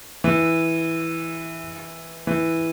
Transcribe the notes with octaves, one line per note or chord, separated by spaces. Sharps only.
E3
E3